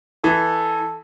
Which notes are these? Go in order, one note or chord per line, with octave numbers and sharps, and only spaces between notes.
E3 A4